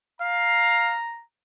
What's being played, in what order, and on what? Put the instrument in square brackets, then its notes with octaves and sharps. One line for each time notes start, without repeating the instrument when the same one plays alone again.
[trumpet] F5 [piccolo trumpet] A#5